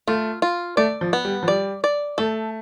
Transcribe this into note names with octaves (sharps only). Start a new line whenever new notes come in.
A3 F4
F4
A3 D5
F3
B3
G3
F3
G3 D5
D5
A3 A4